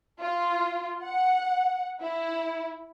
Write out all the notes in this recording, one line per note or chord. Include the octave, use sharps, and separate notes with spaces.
F4
F#5
E4